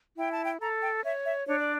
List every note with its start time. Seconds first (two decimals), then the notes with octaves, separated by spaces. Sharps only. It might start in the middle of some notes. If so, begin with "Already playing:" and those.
0.17 E4 G5
0.31 A5
0.44 G5
0.60 A4 A#5
0.82 G5
1.04 C#5 E5
1.25 E5
1.47 D4 C#5
1.60 D5